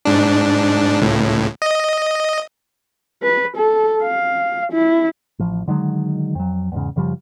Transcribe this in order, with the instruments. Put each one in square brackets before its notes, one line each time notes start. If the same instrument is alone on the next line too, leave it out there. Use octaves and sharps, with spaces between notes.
[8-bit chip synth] G#2 D4
C#2 A2
D#5
[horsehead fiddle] B4
A4
F5
E4
[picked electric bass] A1 F3
D3 D#3 F#3 G#3
F2 F#3
E2 G#2 C#3
F#2 C#3 F3 G3